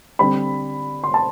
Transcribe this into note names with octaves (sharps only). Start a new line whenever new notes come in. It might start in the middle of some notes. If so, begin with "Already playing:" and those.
D3 G3 C4 B5
C6
A5